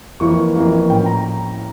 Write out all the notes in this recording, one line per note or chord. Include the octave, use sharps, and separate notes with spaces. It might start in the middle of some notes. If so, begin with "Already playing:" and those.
F2 E3 A#3 C#6
F2 E3 A#3
A2 F3 C#4 G5
A#5